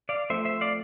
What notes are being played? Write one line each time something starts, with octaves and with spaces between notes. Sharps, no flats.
D5 F5
F3 A3 C4 C5 E5
C5 E5
D5 F5